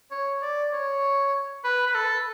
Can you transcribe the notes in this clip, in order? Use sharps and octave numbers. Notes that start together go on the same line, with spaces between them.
C#5
D5
C#5
B4
B4
A4